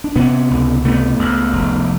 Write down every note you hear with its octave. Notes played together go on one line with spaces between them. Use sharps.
D4
C3 B3 C#4
C#2
C3 A3 B3
C#2
F1